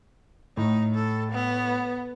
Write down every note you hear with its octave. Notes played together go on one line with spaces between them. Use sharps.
A2 D#4
A4
B3